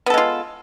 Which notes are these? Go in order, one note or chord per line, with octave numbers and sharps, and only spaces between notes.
G#3 B3 F4 A4